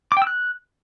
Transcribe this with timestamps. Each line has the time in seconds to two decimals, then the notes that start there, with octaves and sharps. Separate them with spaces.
0.12 D6
0.17 G5
0.22 E6
0.27 F#6